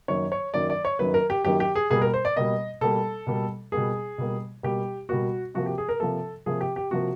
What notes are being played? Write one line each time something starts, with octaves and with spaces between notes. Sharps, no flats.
F#2 D#3 F#3 A#3 C#5
C#5
F#2 D#3 F#3 A#3 D5
D5
C#5
F#2 D#3 F#3 A#3 B4
A#4
G4
F#2 D#3 F#3 A#3 G4
G4
G#4
B2 G3 A#3 G#4
A#4
C5
D5
B2 G3 A#3 D#5
B2 G3 A#3 A4
B2 G3 A#3
B2 G3 A#3 G#4
B2 G3 A#3
B2 G3 A#3 G4
B2 G3 A#3 F#4
C3 F3 A#3 F#4
G4
G#4
A#4
C3 F3 A#3 A4
C3 F3 A#3 G#4
G4
G4
C3 F3 A#3 F#4